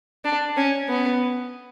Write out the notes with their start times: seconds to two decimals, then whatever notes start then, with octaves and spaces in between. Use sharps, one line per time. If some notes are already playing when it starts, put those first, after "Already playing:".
0.24 D4
0.57 C#4
0.89 B3